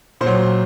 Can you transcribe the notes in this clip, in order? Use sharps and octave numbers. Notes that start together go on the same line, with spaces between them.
A#2 C5
F#3